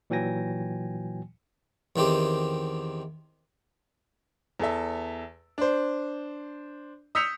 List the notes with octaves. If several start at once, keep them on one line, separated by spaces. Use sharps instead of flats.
A#2 E3 F#3 G5 G#5 A#6
E2 D#3 C4 G4
E2 A4 E5
D4 C5
D#6 E6 G6 B6 C#7 F7